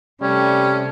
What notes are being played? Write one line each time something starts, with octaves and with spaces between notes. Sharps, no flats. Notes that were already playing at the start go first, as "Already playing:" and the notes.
C3 G3 A3 C#4